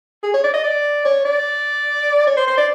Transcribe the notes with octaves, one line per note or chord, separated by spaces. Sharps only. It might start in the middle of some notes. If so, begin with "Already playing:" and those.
G#4
C#5
D5
D#5
D5
C#5
D5
C#5
C5
C5
D5